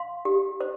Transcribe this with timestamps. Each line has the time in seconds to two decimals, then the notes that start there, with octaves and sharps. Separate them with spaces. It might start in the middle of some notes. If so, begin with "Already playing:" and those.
Already playing: F5 C6
0.25 G4
0.61 C5